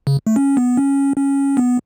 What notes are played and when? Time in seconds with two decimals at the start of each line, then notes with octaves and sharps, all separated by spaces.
0.07 C#3
0.27 A3
0.36 C#4
0.57 B3
0.77 C#4
1.17 C#4
1.57 B3